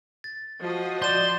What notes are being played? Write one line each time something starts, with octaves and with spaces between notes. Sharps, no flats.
A6
F3 F#4 D#5
D5 C6 G6 E7